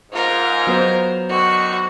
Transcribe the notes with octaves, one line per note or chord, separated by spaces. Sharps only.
G#2 F4 A#4
F#3 B3 C5
D3 D#3 F#4